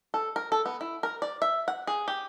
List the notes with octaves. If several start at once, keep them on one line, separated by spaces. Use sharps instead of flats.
A4
A#4
A4
B3
E4
A#4
D5
E5
F#5
G#4
G4